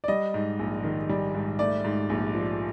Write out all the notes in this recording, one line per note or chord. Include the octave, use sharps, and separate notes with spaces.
D5
G3 D#5
G#2
A#1
D#3
G3
G#2
A3 D5
G#2
A#1
F3